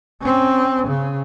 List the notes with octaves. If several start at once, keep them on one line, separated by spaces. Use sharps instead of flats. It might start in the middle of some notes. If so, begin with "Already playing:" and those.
C4 C#4
C#3